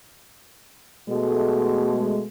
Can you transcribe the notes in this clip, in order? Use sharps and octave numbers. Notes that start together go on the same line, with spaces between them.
B2 G#3 A3